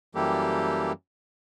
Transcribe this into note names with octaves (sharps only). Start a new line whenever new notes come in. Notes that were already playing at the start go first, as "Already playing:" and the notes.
F#2 E3 G3 A#3 G4 A4